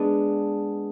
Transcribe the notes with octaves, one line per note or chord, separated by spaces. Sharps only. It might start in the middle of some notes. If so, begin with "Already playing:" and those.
Already playing: G#3 B3 D4